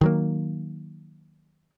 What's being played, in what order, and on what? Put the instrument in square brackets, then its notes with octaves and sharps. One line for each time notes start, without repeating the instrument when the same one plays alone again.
[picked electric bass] D#3 F#3 A#3